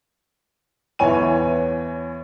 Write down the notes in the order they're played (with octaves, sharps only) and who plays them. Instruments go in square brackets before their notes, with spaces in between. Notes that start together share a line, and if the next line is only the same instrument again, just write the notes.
[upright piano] E2 E3 C#5 G#5 D#7